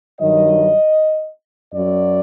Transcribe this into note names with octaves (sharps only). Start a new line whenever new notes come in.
G2 D#3 F#3 D#5
F#2 F#3 D5